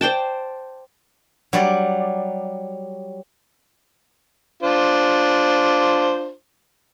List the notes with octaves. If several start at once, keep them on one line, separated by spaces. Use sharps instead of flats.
C5 D5 G5 A5
F#3 G3 D5
D4 F4 C5